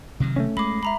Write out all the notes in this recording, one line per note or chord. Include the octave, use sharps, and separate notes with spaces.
C3 D#3 F#3
A3 A#3 C#4
G#3 B5 D6
E5 A#5 B5